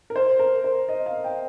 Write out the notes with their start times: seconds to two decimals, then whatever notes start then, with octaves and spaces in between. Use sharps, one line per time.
0.10 A#4
0.16 C5
0.39 A#4
0.64 C5
0.89 D#5
1.06 F5
1.24 G5